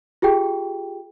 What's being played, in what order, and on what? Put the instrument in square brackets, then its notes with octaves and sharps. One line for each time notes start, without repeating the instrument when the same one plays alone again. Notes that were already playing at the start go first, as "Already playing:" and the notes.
[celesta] F4 G4 G#4 G5